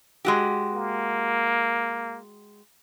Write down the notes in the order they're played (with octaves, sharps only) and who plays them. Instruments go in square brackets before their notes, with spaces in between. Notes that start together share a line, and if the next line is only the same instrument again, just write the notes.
[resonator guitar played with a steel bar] G#3 F#4 G4
[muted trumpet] A#3